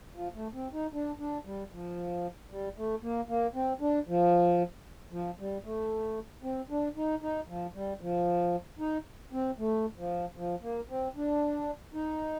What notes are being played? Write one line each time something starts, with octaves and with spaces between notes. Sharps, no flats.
F3
A3
C4
D#4
D4
D4
G3
F3
G3
A3
A#3
A#3
C4
D4
F3
F3
G3
A3
C4
D4
D#4
D#4
F3
G3
F3
D#4
C4
A3
F3
F3
A#3
C4
D4
D#4